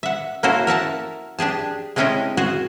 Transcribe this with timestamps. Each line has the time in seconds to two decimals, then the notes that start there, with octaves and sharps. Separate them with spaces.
0.03 E5 F#5
0.43 A#3 C#4 E4 F#4 A4 C5
0.67 A#4 E5 F#5 A5
1.39 D4 G4 G#4 A5
1.96 G#3 A3 C4 C#4 E4 D#5
2.37 F#4 G#4 C5 F#5